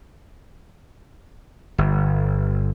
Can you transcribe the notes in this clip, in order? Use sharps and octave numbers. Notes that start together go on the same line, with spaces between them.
G1